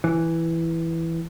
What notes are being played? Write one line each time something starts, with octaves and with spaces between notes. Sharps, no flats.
E3